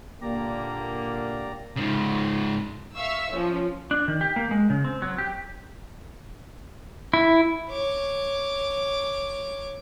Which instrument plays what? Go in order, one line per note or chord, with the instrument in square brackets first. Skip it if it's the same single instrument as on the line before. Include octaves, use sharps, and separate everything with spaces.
[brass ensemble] A#2 D3 A#3 [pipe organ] G4 D5 A#5
[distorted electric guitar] G#2 C#3
[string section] E5 F5 C#6 E6
F3 C#4
[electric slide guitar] D4
D#3
G4
A#3
G#3
C#3
C4
F#3
G4
[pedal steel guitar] E4
[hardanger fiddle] C#5 D6